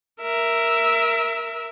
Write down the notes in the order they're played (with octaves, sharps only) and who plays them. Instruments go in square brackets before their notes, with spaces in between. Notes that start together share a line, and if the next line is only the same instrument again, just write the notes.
[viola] A#4 E5